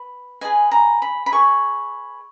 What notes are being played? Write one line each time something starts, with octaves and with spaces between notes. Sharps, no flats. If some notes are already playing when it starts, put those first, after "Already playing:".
Already playing: B4
G#4 B4 D#5 G#5
A#5
B5
B5
G#4 B4 D#5 C#6